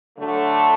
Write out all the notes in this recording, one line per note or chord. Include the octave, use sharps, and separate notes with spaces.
D3 F#3 A3